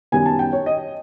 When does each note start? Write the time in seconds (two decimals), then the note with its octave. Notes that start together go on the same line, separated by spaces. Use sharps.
0.12 F#2 D#3 G3 B3 G#5
0.26 A5
0.39 G5
0.53 C#5
0.66 D#5